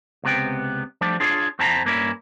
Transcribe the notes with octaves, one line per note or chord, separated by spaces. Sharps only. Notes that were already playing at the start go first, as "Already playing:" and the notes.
C#2 C3 B3 G5
F3 G3 A3 D4
D4 F4 G#4 C#5
F2 C4 E4 A5 A#5
G2 A#3 C#4 E4